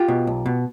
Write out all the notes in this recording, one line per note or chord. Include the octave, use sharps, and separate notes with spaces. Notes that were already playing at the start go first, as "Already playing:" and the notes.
Already playing: F4 G4
B2
B1
B2